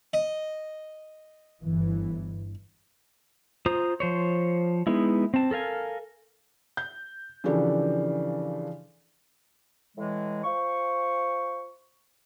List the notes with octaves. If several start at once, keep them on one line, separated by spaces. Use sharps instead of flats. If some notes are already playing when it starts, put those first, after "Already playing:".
D#5
G1 E3
F4 C5 A#5 D#6
F3 C5 C#5
G#3 B3 D#4 E4
C4 A5
A4 A#4 F5 G#5
G6
C#3 E3 F3 D4 G4 A4
A2 E3 G#3
F4 C5 C#6